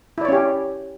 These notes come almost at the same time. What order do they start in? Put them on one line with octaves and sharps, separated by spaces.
E4 D5 C#5 C#4 G4